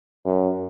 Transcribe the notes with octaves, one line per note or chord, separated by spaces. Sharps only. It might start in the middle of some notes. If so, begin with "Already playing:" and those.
F#2